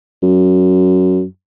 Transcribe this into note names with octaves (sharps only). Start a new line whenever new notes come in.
F#2